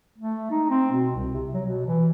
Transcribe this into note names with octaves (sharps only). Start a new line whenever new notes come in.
A3
D#4
C4
B2
C2
C3
F#3
B2
E3